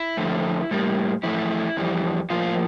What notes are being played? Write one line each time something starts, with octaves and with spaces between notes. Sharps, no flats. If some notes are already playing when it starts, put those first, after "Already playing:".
Already playing: E4
F2 D3 A3
A2 G3 A#3
F2 E3 A3 E4
F2 E3 G3
A2 F3 A#3 F4